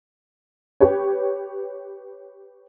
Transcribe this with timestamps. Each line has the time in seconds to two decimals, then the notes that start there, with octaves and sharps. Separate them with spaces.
0.80 G4 B4 C#5